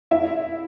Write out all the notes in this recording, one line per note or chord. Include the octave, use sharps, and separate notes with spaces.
E4 E5